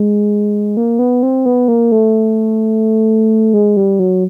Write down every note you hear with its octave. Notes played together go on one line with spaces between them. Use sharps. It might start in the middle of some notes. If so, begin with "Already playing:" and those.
Already playing: G#3
A#3
B3
C4
B3
A#3
A3
G#3
G3
F#3